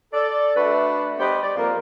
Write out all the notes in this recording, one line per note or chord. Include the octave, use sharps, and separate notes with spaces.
A4 D5
A3 D4 F#4 B4
G3 B3 G4 B4 C5 D#5
D5
F2 A#3 A#4